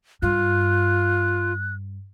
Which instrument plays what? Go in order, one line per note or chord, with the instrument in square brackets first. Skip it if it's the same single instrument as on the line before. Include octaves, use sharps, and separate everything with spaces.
[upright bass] G2 [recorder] F4 [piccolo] F#6